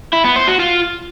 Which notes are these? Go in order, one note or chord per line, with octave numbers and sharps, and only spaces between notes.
E4
B3
C5
F#4
F4